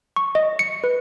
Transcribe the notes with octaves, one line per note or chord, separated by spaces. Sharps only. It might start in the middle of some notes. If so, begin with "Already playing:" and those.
C#6
D#5
C#7
B4